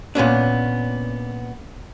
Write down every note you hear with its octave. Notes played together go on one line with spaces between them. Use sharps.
A#2 B3 C#4 D4